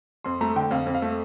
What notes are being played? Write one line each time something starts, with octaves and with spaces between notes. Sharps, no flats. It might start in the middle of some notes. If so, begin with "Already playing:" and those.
F2 C6
A3 A#5
D3 G5
F2 F5
F2
F5
A3